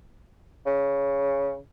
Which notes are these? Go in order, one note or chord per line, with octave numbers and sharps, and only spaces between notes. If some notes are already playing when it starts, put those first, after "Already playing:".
C#3